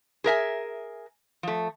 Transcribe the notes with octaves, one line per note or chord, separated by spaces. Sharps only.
G#4 A#4 E5 G#5
F3 A3